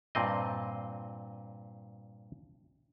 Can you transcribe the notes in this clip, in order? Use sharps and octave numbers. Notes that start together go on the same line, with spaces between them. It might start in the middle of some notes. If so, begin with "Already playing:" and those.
G2 A#2 C4 D#5